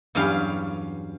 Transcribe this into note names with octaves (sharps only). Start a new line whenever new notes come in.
E2 G2 F#3 C#4 G4 F5